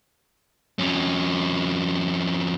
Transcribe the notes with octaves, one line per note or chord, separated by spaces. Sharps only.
F2 C#4